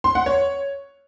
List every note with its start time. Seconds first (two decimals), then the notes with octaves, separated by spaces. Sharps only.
0.04 C6
0.15 F#5
0.26 C#5